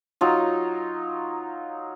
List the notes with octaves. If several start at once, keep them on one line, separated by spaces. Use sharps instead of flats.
F#3 D#4 F4